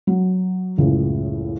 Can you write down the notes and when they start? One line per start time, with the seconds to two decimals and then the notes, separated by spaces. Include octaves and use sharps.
0.07 F#3
0.78 F#1 C#2 A2 C#3